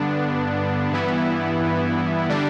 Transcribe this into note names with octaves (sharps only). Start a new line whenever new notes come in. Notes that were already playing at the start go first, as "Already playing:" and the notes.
Already playing: G2 D3 B3 D4
G2 E3 B3 E4
D3 G3 D4